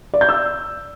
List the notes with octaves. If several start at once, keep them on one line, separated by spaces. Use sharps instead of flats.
D5
G6
E6